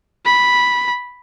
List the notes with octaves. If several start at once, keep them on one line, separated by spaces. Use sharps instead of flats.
B5